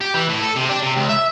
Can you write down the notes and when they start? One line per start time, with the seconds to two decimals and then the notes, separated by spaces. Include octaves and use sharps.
0.01 G4
0.14 E3
0.29 A2
0.42 A4
0.56 C3
0.69 D4
0.82 C3
0.97 C#2
1.10 E5